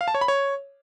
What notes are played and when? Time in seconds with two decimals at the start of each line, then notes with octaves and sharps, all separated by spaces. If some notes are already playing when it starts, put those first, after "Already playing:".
0.01 F5
0.08 A5
0.14 C#5
0.21 B5
0.28 C#5